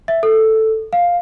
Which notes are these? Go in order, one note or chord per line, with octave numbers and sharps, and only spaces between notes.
E5
A4
F5